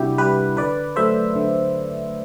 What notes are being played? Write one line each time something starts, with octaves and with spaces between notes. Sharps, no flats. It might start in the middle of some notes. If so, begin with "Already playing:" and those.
Already playing: C3 G3 D4 E4 F#4 G4
G3 G4 B4
D3 B4 D5
F#3 A3 C5 E5
D3